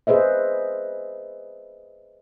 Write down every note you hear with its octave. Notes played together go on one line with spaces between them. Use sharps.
G#4 B4 C5 D#5 E5